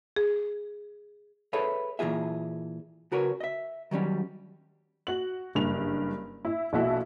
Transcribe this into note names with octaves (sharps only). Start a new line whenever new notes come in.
G#4
G#4 A4 B4 C#5 E5
A#2 E3 F4 G#4 E5
C#3 F#4 A#4 B4 C#5
D#5 E5
D#3 F#3 G3 C#4
F#4 F#7
F#1 G2 F7
E4 E5
A#1 B2 E4 F#4 A4 E5